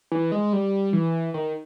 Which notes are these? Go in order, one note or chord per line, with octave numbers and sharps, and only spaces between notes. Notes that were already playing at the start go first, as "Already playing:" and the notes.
E3
G#3
G3
E3
D#3